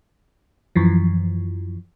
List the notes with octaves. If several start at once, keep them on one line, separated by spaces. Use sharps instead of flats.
F#2 E3 F3